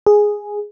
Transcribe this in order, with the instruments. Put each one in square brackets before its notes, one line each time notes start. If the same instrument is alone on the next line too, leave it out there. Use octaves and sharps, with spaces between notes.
[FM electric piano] G#4